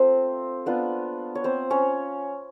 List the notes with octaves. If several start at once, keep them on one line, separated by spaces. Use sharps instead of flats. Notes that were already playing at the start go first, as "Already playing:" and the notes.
Already playing: A3 C4 F4 C5
A#3 B3 D4 F4 B4
C#5
C4 C5
C#4 C#5